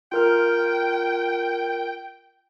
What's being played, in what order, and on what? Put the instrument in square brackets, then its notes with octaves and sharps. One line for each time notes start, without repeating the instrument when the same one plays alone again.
[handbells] F4 A#4 F6 [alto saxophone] G5